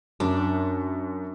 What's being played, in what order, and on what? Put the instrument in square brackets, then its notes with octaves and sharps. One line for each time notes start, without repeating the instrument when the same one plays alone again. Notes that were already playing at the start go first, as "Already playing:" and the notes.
[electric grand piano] F#2 [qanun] D4